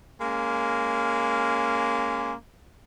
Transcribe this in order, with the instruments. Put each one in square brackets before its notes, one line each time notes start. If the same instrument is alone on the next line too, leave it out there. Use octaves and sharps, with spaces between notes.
[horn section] G#3 A#3 C#4